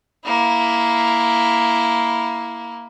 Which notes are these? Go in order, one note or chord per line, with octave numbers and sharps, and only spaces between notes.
A#3 E4